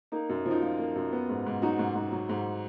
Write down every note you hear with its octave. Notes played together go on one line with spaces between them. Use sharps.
A#3 D#4
F#2
F3
D#4
F3 F4
A#3
F#2
B3
G#2
G#2
F#3 D#4 F#4
G#2
G#2
F#3
G#2